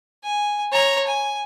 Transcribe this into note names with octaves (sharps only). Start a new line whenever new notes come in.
G#5
C#5 A#5
G#5